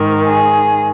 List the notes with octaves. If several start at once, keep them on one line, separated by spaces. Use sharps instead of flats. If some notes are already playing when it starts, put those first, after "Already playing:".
Already playing: G#2 D#3 A#4
G#4